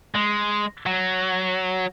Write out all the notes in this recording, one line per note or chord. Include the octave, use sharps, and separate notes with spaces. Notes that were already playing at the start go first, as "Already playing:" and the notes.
G#3
F#3